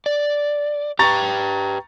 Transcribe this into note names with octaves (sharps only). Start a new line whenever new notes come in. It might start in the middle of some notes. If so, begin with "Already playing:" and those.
D5
G4 B4 G5 A#5 C#6 A6